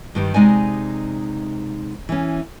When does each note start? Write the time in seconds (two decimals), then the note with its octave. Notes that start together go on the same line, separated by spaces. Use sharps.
0.15 G2 D#3 G3
0.34 C3 G#3 D#4 D5 G#5
2.09 E3 C#4